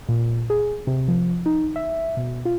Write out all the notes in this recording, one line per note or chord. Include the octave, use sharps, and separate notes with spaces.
A#2
G#4
C3
F3
D#4
E5
B2
F4